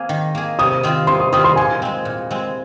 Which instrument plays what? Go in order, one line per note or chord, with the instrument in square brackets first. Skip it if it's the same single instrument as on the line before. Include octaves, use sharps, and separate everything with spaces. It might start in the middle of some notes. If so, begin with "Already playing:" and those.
Already playing: [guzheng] A#3 C4 G#4
D#3
A#3 G#4
[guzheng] C3 [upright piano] D#6
[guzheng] D#3 C4 F4
[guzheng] C3 [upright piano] C6
[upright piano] D#6
[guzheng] D#3 C4 F4 [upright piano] D#6
[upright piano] C6
[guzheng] A#2 [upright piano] G#5
[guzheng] G#3 C4
A#2
G#3 C4